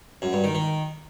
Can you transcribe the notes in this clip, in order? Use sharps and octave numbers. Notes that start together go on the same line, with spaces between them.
F#2
G2
D#3
D#3